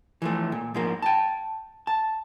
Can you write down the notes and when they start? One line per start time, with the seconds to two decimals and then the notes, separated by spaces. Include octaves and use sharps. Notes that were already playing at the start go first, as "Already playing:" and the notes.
0.22 E3 F3 A3
0.52 A#2
0.74 G#2 F3 A#3
1.02 G5 A5
1.87 A5